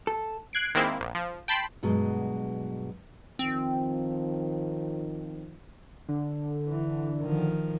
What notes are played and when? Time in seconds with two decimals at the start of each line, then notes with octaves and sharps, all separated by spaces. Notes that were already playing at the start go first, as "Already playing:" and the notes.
0.07 A4
0.53 F#6 G#6 C7 D7
0.75 D#3 G#3 A#3 C4 E4
1.01 A#1
1.15 F3
1.48 G5 A5 B5 C6
1.83 G2 B2 F#3 G#3
3.39 D#3 F3 C4
6.09 D3
6.68 E3
7.21 D#3 F3